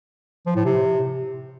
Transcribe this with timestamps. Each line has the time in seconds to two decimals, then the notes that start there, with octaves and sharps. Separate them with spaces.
0.46 F3
0.56 A2
0.65 C3